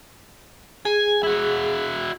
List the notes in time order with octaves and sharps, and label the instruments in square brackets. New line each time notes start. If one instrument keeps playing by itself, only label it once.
[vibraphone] G#4 [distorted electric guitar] G#5
[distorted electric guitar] E4 F#4